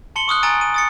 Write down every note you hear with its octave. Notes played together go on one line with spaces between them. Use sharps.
A5 C6 C#7 F#7 G7
C#6 D#6 F6 F#6
G#5 A#5 E6 A6 D7 D#7
D#7
D#6 A6 C#7